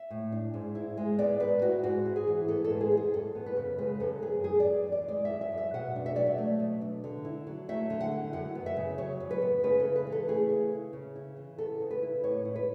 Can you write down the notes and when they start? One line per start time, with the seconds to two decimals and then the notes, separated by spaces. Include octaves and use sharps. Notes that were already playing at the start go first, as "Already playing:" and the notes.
Already playing: E5
0.10 A2
0.32 D4
0.54 G#2
0.75 E4
0.97 G#3
1.19 B3 D5
1.40 G#2 B4
1.62 E4 F#4
1.83 G#2 F#4
2.06 E4
2.16 G#4
2.27 E3
2.48 B3 A4
2.64 A4
2.70 G#2
2.81 G#4
2.92 E4
2.97 G#4
3.14 F#2 A4
3.35 B3
3.46 B4
3.57 C#3
3.78 G#3 B4
4.00 F#2 A4
4.22 B3 G#4
4.44 F#2 G#4
4.60 D5
4.66 F#2
4.87 E3 D5
5.08 G#3 D5
5.25 E5
5.30 F#2
5.41 E5
5.52 F#2
5.58 E5
5.74 B2 F#5
5.96 D4
6.06 E5
6.16 F#3 D5
6.26 E5
6.38 A3
6.60 B2
6.81 D4
7.04 D3
7.25 E4
7.47 F#3
7.69 A3 E5
7.90 D3
8.01 F#5
8.12 E4
8.33 F#2 F#5
8.55 B3
8.66 E5
8.77 C#3
8.98 F#3 C#5
9.20 F#2
9.31 B4
9.42 B3
9.63 C#3 B4
9.80 A4
9.85 E4
9.96 B4
10.07 E3
10.12 A4
10.28 A3 G#4
10.50 C#3
10.72 E4
10.93 C#3
11.16 E4
11.36 E3
11.58 B3 A4
11.80 C#3
11.91 B4
12.02 E4
12.23 A2 C#5
12.45 E4
12.56 B4